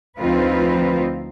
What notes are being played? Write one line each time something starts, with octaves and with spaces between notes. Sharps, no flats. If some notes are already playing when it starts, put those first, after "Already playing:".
D2 F3 C4 D#4 F4 B4